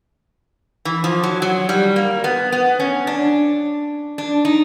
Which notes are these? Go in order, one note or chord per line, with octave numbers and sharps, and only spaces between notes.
E3
F3
F#3
F#3
G3
A#3
B3
B3
C#4
D4
D4
D#4